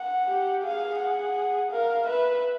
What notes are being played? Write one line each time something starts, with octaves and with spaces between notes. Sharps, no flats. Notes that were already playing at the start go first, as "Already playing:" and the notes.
Already playing: F#5
G4
G#4 F5
F#5
A#4 F5
B4 E5